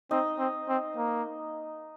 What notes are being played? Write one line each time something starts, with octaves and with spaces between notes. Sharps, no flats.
C4 D#4 D#5
C4
C4
A#3